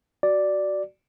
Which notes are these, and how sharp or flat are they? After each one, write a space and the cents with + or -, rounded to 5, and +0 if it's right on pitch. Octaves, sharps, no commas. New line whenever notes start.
F#4 +15 D5 +0